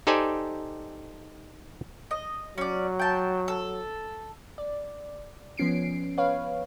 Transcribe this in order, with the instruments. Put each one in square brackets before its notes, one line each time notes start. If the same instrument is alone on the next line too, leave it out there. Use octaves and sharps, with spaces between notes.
[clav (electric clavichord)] D#4 G4 A4 C5 D5 G#5
[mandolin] D#5
[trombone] F#3 [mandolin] C#4 D5
[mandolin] G5 A5
A4
[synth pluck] D5
F3 B3 C#4 C7 D7
B4 C#5 F5